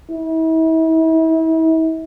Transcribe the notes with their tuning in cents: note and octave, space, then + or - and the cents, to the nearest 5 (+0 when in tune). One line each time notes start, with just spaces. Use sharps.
E4 -40